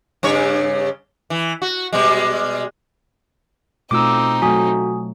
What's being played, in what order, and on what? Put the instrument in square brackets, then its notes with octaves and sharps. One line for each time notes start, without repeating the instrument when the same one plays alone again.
[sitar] G2 C#3 C#5
E3
F#4
B2 G3 G#3
[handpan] B2 A3 F4 [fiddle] C4 D#4 [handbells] D6 E6
[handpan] F#3 A3 [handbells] F#4 [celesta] G#5 D#6